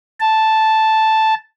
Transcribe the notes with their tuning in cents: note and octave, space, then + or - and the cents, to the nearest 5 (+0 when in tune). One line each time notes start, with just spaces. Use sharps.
A5 -5